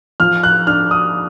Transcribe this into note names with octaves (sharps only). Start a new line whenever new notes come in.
F3 F6
F#6
D4 F6
D#6